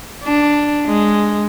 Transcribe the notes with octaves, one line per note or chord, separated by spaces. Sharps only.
D4
G#3